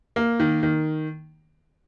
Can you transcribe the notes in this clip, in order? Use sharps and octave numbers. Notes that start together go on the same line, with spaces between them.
A#3
D#3
D#3